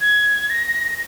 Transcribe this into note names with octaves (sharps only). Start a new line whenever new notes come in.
G#6
A#6